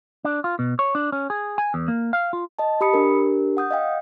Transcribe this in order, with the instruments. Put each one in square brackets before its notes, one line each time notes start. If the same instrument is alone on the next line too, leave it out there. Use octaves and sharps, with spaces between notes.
[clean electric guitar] D4
F4
B2
C#5
D4
C#4
G#4
G#5
E2
A#3
F5
F4
[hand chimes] D#5 A5
G4 B5 D#6 C#7
D4 G4 A#4
F#5 D#6 G6
D#5 F5 G5